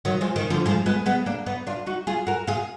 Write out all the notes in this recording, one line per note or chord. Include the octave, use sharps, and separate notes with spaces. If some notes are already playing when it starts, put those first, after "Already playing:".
D#3 F#3
F3 G#3
D#3
D3 F3
F3 G#3
G#3 B3
G#3 B3
A#3 D4
B3 D#4
D4 F4
D#4 F#4
F4 G#4
F#4 A#4
F4 G#4